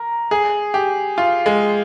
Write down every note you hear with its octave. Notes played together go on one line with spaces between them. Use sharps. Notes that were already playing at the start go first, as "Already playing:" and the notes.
Already playing: A#4
G#4
G4
F4
G#3